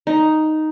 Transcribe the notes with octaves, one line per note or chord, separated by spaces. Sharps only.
D#4